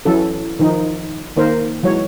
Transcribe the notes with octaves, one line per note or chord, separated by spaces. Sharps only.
E3 F#3 C#4 A4
D#3 F3 D#4
D#3 A#3 A#4 C5
E3 F#3 G#3 C#5